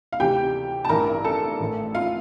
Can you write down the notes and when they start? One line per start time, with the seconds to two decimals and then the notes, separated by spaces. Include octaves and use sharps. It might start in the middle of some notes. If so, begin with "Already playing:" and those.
0.13 F5
0.20 D2 C3 E3 G4 G5
0.85 A5
0.89 A1 G2 E3 A#4 A#5
1.24 A4 A5
1.60 A1 A2 E3
1.95 F4 F5